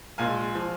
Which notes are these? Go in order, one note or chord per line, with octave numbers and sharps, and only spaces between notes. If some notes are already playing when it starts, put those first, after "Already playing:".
A#1 A#2 G#3 F5 G#5
F3